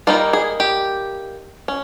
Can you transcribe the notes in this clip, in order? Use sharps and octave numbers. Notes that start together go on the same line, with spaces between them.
G3 A#3 D#4 F4
G#4
G4
C#4